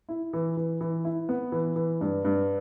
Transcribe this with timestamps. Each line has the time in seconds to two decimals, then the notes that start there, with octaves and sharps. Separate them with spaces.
0.09 E4
0.33 E3
0.57 E3
0.81 E3
1.05 E4
1.29 B3
1.52 E3
1.76 E3
2.01 G2
2.25 G2